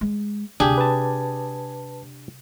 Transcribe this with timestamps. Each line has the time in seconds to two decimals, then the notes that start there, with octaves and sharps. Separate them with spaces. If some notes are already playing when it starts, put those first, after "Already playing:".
0.01 G#3
0.60 D2 C3 D4 G4 G#4
0.78 B4 A5